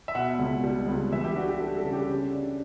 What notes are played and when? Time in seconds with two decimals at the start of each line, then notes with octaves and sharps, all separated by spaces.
0.08 E5
0.15 B2 F#5
0.39 C#2
0.64 G3
0.88 C#2
1.12 E3 E5
1.24 G4
1.36 D4 F#4
1.48 G4
1.60 G3 A4
1.77 A4
1.85 C#3
1.93 G4
2.09 C#3
2.33 D4